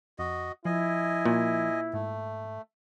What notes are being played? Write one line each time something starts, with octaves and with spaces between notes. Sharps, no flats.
F2 F#4 D#5
F3 E4 D#5 G#5
A#2
G#2 A3